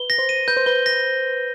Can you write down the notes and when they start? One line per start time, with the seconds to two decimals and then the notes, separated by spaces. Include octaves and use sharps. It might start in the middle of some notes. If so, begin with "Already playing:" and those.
Already playing: B4 G7
0.10 A#6
0.18 C5
0.29 D#7
0.48 B4 G6
0.57 C5
0.66 B4 G7
0.86 A#6